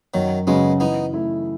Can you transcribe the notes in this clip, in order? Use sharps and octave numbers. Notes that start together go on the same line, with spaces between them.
F#2 D#3 F#3
C#3 F#3 G#3 B3 C#4 F#4
E3 B3 D#4
A3 E4